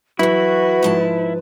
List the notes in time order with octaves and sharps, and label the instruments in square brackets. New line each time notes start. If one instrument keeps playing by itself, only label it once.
[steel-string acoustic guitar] E3 F#3 [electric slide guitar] E4 [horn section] F#4 [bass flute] B4
[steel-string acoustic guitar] G#2 F3 A5